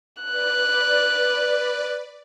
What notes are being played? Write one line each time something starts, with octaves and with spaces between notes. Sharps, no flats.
B4 D5 F#6